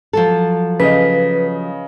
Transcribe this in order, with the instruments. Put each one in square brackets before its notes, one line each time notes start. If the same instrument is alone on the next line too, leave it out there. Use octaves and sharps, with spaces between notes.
[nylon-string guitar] F3 F#3 A4
[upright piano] C#3 D#5 [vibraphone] B4